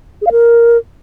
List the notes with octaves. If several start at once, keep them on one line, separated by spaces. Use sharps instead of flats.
G#4
F5
A#4